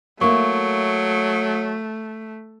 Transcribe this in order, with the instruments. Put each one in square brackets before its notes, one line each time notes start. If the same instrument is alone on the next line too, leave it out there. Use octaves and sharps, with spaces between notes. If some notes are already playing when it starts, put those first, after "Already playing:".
[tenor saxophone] F#3 [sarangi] A3 [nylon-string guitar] A#3 E4 [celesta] C#6